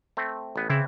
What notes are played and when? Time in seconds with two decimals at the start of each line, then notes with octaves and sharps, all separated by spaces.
0.17 A3 C4
0.56 A1 B3
0.70 C#3 E3 C4 E4